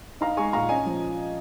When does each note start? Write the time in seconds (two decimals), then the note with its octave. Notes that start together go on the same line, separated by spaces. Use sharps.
0.21 D#4 F5 A#5
0.37 G#3 G#5 C#6
0.53 A#2 F5 A#5
0.69 C#4 D#5 G#5
0.85 F3